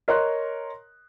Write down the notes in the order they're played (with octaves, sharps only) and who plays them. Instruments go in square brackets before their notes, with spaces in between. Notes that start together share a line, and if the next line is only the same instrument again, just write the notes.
[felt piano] A#4 C#5 D#5 C6 F#6